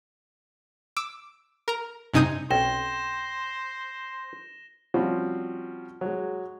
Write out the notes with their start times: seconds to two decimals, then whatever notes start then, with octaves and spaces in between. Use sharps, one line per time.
0.97 D6 E6
1.68 A#4 A#5
2.13 G2 C3 D#4 G#5 D#6 G6
2.50 B1 C4 C#4 C5 G5 A#6 E7 G7
4.94 F3 G3 C4 C#4 F#4
6.01 F#3 G#3